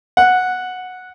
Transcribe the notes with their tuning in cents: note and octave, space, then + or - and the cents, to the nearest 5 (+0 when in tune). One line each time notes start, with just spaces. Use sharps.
F#5 -10